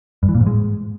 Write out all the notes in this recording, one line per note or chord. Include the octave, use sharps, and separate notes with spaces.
G2
E3
A#2
G#2
G#3